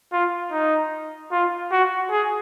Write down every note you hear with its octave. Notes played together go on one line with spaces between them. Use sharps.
F4
D#4
F4
F#4
G#4